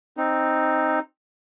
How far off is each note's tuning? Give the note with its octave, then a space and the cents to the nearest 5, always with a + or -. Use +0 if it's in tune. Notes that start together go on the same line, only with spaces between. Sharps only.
C4 +5 D#4 +0